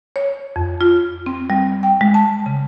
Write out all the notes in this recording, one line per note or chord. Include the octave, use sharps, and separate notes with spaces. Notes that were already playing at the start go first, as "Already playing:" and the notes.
C#5
F2
F4
C4
G3
G5
G#3
A5
C#3